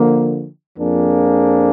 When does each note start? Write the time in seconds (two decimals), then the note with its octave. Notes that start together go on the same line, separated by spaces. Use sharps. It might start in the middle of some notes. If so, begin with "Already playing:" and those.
Already playing: D3 F3 A#3
0.79 F2 F3 A#3 D4 G#4